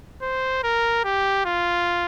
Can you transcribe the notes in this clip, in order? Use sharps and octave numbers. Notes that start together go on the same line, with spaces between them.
C5
A#4
G4
F4